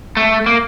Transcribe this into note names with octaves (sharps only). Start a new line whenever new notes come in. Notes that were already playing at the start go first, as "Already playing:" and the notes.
A3
A#3